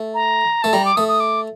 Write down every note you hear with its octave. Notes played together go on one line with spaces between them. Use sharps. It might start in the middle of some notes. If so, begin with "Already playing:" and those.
Already playing: A3
A#5
A3 A5
G3 A#5
D6
A3 D#6
D#6
D6